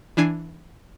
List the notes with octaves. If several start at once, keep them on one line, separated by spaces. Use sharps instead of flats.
E3 D4 G#5 C7